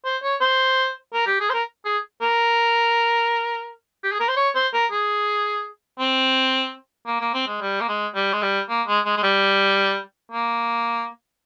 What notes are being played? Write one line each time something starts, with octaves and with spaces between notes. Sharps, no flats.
C5
C#5
C5
A#4
G4
G#4
C5
A#4
G#4
A#4
G4
G#4
A#4
C5
C#5
C5
A#4
G#4
C4
A#3
A#3
C4
G#3
G3
A#3
G#3
G3
G#3
G3
A#3
G#3
G#3
G#3
G3
A#3